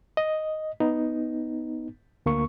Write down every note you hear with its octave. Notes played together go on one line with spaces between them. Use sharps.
D#5
B3 D#4
D2 A#3 C#6